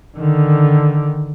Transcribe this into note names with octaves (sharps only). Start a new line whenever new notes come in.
D3 D#3